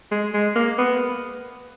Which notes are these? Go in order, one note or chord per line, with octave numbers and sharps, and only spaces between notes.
G#3
G#3
A#3
B3